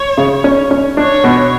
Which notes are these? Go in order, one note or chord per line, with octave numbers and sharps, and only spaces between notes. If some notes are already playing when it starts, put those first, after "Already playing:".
Already playing: C#5
C#3
C#4
C#4
D4 C#5
B2